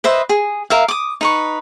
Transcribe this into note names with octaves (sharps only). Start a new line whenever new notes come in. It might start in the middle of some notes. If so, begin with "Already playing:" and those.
B4 C5 D#5 E5
G#4
A#4 E5 F5
D6 D#6
D#4 B4 C#6